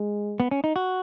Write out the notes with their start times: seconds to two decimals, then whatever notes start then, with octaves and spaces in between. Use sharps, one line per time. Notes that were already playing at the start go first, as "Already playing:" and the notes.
Already playing: G#3
0.40 B3
0.51 C#4
0.64 D#4
0.76 F#4